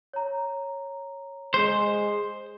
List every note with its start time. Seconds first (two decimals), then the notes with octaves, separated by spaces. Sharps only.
0.13 C#5 A#5
1.54 G#3 C5